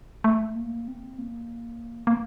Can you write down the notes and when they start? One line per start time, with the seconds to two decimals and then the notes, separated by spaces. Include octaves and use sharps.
0.24 A3
0.55 A#3
0.88 C4
1.18 A#3
2.07 A#3